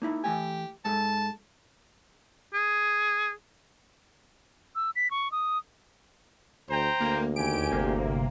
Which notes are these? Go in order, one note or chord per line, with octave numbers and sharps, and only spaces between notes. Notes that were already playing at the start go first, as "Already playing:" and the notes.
A#3 D#4 E4
E3 A3 G4 G#5
G#2 G#3 A4 A5
G#4
E6
B6
C#6
D#6
D2 C5 G5 A#5
D2 A#3
D#2 G4 G#5 D7
G1 C3 A#3